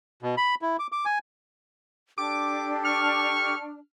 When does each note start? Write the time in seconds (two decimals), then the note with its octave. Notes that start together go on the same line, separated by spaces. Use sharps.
0.23 B2
0.37 B5
0.62 E4
0.79 D6
0.92 D6
1.05 G#5
2.18 D4 G4 A4 D6
2.85 C#6 F6